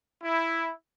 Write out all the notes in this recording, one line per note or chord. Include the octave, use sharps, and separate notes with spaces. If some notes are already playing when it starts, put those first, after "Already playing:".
E4